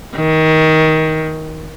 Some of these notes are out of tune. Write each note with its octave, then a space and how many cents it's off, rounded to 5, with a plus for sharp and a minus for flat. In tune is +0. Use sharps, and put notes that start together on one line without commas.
D#3 +20